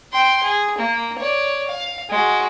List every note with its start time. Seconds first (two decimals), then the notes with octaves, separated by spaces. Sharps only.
0.13 G5 C6
0.43 G#4
0.78 A#3
1.18 C#5 D5
1.68 F5
2.09 G#3 F#4